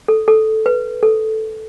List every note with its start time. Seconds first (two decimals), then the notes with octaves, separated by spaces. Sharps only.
0.08 A4
0.28 A4
0.66 B4
1.03 A4